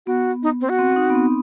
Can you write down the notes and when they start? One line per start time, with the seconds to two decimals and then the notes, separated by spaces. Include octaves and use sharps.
0.06 B3 F#4
0.43 D#4
0.61 C4
0.69 F#4
0.79 C4
0.92 C4
0.96 D#4
1.10 B3
1.15 C4